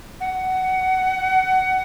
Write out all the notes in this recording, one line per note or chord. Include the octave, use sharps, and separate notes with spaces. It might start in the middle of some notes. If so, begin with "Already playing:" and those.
F#5